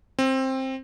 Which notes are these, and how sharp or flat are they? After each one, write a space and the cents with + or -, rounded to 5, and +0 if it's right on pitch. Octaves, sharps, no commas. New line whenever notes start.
C4 +15